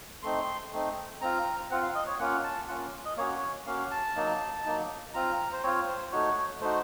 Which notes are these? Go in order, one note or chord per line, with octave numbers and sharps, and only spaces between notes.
A3 C4 D#4 C6
A3 C4 D#4
C4 F4 A#5
C4 F4 F#5
F5
D#5
C#5
A#3 C#4 F4 F#5
A5
A#3 C#4 F4 F#5
D#5
A#3 C#4 F#4 C#5
A#3 C#4 F#4 F5
A5
F#3 A#3 D#4
F#3 A#3 D#4
C4 F4 A#5
C5
C4 F4 C#5
C5
A3 D#4 F#4 C#5
A3 D#4 F#4 C5